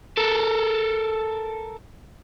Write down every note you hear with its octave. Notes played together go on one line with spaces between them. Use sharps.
A4 A#4